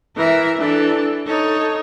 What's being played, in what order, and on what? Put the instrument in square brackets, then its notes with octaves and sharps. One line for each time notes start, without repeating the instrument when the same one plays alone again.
[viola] E3 [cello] A#4 E5
[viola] E3 A4 [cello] D4
[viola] D#4 C#5 [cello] A4